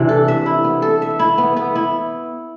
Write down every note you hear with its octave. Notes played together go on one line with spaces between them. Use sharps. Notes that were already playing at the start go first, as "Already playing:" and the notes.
Already playing: C3 E3 D4
A4
E5
E4
B3
A4
E5
E4
B3
B3
E4